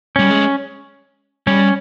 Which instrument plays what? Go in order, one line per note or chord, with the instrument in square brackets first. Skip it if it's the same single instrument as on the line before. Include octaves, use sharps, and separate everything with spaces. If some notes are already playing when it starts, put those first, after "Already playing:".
[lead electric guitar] G3 [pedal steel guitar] C#4
[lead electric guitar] G#3
[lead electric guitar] G3 [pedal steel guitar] C#4